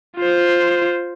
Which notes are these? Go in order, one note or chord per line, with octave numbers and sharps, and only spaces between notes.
F4 C5